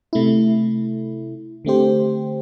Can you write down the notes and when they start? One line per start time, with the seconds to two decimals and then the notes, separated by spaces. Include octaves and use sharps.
0.13 C3 A3 E4
1.65 D3 A3 C4 G4 C5